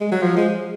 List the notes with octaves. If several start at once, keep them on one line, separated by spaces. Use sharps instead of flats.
G#3
F#3
F3
G#3